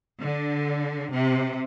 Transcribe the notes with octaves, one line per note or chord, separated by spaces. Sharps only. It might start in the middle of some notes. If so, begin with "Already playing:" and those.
D3
C3